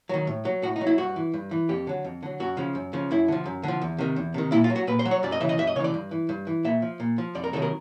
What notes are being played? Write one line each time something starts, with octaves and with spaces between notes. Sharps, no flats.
D#3 F#3
A2
F#3
A2 F#4
D#4
F#3
E4
G2 F#4
E3
G2
E3
F2 G4
D3 F#3
F2
D3 F#3
F#2 F#4
C#3 F3
F#2
C#3 F3
F#2 E4
D3 F3
F#2
D3 F3
E2
C3 D#3
E2
C3 D#3
A#2 E4
F4
F#3
F#4
A#2 B4
C5
F#3
C#5
F#2 D5
D#5
C#3 E3 E5
D#5
F#2 E5
D#5
C#3 E3 C#5 D5
G2
E3
G2
E3
A#2 E5
F3
A#2
F3
F2 D5
A#4
C3 D#3 F#3 A4
A#4